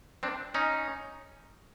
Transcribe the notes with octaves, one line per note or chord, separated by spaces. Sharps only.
C4 D4
C#4 D#4